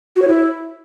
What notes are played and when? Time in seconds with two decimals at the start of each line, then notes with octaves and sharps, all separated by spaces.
0.16 F#4
0.22 C#5
0.28 E4